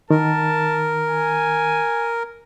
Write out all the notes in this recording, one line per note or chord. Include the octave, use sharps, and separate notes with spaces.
D#3 A#4 A5
G#5